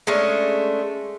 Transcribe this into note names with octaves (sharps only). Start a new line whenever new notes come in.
G#3 A3 C#4 D4